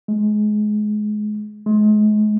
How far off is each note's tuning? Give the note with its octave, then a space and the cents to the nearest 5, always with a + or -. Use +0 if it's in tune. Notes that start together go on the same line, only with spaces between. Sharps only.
G#3 +25
G#3 +35